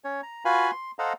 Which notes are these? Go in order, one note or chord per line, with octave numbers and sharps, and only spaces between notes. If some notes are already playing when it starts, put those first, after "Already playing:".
C#4 C#5
A#5
F4 F#4 B4 F5 G#5 B5
C6
A4 C5 D#5 F5 F#5 A#5